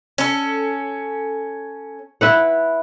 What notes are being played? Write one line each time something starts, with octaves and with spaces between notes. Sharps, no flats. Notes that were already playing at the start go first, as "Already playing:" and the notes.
C#4 A4
E4 B4 F#5